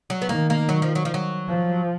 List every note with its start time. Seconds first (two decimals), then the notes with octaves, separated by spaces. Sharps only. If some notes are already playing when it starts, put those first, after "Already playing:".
0.10 F#3
0.22 B3
0.29 D#3 A#3
0.50 A#3
0.69 F#3
0.82 F3
0.95 F#3
1.05 F3
1.14 F#3
1.48 F3